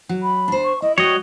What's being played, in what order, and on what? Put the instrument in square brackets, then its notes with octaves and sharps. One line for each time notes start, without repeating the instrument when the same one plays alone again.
[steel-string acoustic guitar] F#3
[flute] B5
[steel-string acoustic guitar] D4 C5
[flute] C#6
[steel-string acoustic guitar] E4 [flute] D#5
[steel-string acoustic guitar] G3 [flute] F#4 [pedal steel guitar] C#5 D#5